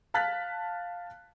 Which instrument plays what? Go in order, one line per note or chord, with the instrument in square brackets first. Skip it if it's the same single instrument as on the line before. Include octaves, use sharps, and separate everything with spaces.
[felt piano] F5 A5 F6 F#6 A6 B6